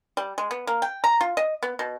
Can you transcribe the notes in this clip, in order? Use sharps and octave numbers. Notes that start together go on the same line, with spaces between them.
G3
G#3
B3
A#3
G5
A#5
F4
D#5
B3
B2